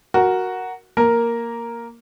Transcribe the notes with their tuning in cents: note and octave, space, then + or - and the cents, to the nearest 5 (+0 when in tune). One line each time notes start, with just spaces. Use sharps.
F#4 +0 A#4 +0
A#3 +0 A#4 +0